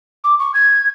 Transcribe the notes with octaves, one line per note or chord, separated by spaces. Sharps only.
D6
C#6
G#6